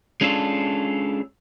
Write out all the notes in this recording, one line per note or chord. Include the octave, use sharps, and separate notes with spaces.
G#3 C#4 D4 F4 A4